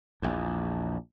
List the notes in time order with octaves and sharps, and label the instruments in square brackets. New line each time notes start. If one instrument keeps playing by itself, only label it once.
[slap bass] A#1 E2